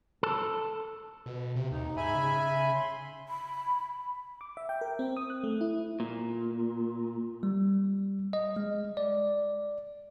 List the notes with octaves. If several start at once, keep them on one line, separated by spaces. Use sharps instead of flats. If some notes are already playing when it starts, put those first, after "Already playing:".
A4
B2
C3
D#2 D#4
G#2 E5 G#5 B5
C#3
C6
B5
D6
E5
G5
A#4
C4
D#6
F#6
A3
E4
A#2
G3
D#5
G#3
D5